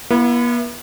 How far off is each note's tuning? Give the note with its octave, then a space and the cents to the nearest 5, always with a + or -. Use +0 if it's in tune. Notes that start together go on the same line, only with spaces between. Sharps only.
B3 -45 E4 +25